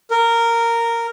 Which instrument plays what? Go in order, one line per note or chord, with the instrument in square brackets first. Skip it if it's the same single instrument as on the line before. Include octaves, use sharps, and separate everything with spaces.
[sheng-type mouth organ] A#4